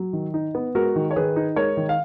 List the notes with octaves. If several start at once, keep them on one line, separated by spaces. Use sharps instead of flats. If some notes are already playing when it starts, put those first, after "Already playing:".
Already playing: F#3
D#3
D#4
B3
G#3 F#4 A#4
D#3
C#5
D#3 G#4 B4
D#4
G#3 A#4 C#5
D#3
F5